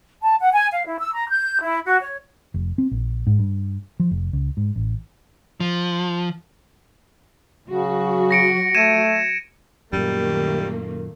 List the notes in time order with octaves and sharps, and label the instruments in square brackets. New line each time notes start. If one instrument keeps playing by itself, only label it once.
[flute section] A5
F#5
G#5
F5
E4
E6
A#5
G6
E4
F#4
C#5
[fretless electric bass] F1
C4
A#1
G#2
G2
F3
F1
C#2
G#2
A1
[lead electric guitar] F3
[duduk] C#3 [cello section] F#3 F#4
[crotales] A#6 C#7 D7
[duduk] A3 [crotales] G#6 D#7 E7
[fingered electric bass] F#2 A#2 [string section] D#3 A3 A#3 [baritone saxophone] G3